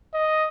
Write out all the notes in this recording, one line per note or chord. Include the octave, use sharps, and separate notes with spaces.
D#5